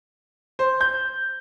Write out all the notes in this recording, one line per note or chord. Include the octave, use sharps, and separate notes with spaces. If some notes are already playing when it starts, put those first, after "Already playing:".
C5
G6